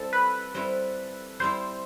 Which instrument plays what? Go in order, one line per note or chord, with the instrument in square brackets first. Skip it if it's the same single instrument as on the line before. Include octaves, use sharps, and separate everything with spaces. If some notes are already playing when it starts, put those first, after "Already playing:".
Already playing: [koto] G3 C4 E4 [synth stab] A4
[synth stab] B4
[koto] G3 C4 E4
[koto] G3 C4 E4 [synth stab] C5